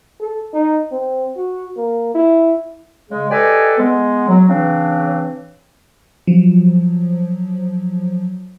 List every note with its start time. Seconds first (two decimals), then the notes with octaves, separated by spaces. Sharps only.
0.20 A4
0.53 D#4
0.92 C4
1.36 F#4
1.77 A#3
2.14 E4
3.11 C#3 G#3 G#4
3.31 G4 A4 B4 D5 D#5 G#5
3.78 G#3 B3
4.28 F#3
4.49 C#3 E3 C4 D4
6.27 F3 F#3